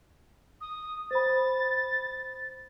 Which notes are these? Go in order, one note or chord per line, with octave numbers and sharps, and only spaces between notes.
D#6
C5 B5 A6